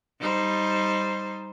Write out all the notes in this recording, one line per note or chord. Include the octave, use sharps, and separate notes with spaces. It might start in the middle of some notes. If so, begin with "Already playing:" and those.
G3 D#4 C5